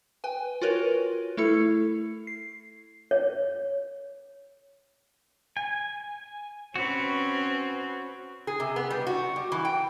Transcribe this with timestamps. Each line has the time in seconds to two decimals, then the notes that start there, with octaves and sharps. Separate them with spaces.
0.24 B4 G5 G#5
0.62 F4 F#4 A#4 B4 C#5
1.37 A3 E4 A4 C#7
2.27 C7
3.11 C#5
5.57 G#5
6.76 C4 C#4 F#4 B4
8.47 G#4
8.60 C3
8.76 B3
8.90 G3
9.07 F#4
9.36 G3
9.52 E3
9.65 G5